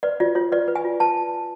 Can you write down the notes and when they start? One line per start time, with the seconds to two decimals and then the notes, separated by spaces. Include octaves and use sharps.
0.03 B4 D5
0.20 F4 D5
0.35 F4 C#5
0.52 B4 D5
0.68 B4
0.76 G#5
0.85 F4
1.00 B4 A5